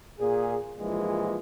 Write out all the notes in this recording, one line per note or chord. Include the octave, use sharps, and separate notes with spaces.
A#2 G#4
G2 A#2 E3 F3 G#3